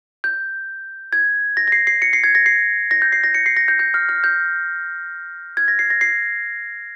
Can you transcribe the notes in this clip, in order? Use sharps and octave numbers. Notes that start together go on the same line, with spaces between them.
G6
G#6
A#6
A#6
C7
C7
C#7
C7
G#6
A#6
C7
A#6
G6
C7
A#6
C#7
C7
A#6
G6
G6
F6
F6
G6
G#6
A#6
C7
A#6
C7